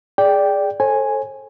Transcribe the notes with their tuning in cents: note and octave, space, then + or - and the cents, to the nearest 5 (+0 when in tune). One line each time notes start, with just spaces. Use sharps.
G#4 +0 D5 -5 G5 +0
A4 +0 C5 +45 G#5 +0